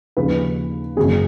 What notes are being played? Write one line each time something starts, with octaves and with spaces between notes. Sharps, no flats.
D#2 C#3 F3 B4
F#1 F#2 C#3 F#3 G#4